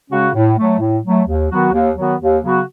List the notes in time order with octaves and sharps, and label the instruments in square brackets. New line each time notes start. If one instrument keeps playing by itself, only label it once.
[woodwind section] C#3 G#3 C#4 F#4
A2
F#3 A3
A2
F#3 A3
D#2
D#3 F#3 B3 F#4
D#2
D#3 F#3 B3 F#4
D#2
C#3 F#3 B3 F#4